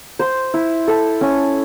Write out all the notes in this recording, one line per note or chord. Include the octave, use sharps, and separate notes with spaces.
C5
E4
A4
C#4